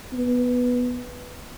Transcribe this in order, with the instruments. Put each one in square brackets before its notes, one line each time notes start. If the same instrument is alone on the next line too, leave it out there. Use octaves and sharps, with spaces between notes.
[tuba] B3